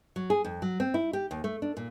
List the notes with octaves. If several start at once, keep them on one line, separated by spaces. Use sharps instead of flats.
F#3
G#4
F2
F#3
C4
E4
G4
D#2
A3
D4
A#2